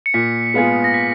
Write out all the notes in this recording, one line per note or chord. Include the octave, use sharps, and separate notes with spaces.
C#7
A#2 B6
G#3 B3 F4 G#4
A#6
B6